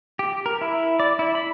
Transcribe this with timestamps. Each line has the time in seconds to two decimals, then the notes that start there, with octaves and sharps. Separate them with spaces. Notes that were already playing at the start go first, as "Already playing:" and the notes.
0.19 G4
0.46 A#4
0.61 E4
1.00 D5
1.19 E4
1.35 B5